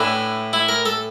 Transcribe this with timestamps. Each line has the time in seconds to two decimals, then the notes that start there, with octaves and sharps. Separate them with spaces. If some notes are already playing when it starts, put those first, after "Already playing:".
Already playing: A2 E3 D4
0.53 E4
0.69 A#4
0.86 A4